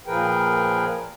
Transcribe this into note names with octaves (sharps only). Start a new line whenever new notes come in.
A#2 F3 G#4 A#4 B4 G5